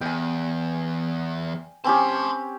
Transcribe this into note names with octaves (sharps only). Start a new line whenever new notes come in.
E2 G5 G#5
C4 C#4 G4 A5 C6